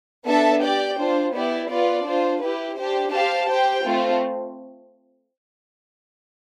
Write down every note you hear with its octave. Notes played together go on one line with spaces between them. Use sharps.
B3 D4 A4 E5 A5
G4 D5 G5
D4 F4 C5
B3 E4 G4 D5
B3 F4 B4 D5
D4 F4 C5
E4 G4 B4
D4 G4 C5
G4 C5 F5 A5
G4 C5 G5
A3 C4 F4